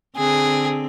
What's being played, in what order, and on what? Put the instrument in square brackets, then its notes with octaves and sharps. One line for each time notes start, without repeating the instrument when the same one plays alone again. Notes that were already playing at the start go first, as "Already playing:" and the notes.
[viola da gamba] D3 C4 [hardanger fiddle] G#4